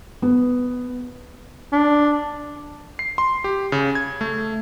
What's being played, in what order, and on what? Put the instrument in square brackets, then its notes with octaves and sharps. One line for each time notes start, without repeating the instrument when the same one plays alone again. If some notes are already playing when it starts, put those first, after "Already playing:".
[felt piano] B3
[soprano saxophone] D4
[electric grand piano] C7
C6
G4
C#3
G#6
A3